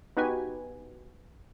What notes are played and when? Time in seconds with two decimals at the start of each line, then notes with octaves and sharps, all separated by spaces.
0.17 B3 D#4 F#4 G4 B4 G#5